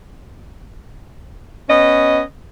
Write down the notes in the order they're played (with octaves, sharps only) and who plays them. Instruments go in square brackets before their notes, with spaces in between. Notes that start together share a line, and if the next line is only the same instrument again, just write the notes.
[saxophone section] B3 C#4 D#5